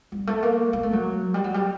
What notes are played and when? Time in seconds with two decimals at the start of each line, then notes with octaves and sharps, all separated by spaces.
0.12 G3
0.27 A3
0.43 A#3
0.73 A#3
0.83 A3
0.93 F#3
1.34 G3
1.44 F#3
1.54 G3